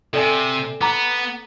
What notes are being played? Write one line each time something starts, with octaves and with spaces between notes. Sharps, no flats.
C3 A4 D5 G#5
B3 A#5 D6